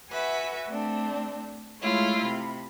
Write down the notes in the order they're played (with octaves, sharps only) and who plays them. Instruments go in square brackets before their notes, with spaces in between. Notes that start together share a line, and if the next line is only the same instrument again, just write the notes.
[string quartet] F#4 B4 E5 G#5
A3 C4 D4
G#3 A3 E4 F4 C#5
C3 B5